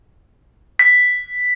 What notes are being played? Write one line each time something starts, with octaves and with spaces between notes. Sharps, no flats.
B6